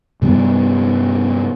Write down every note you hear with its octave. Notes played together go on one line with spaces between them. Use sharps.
G2 C3 G3 B3